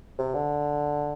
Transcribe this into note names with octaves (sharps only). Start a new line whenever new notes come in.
C3
D3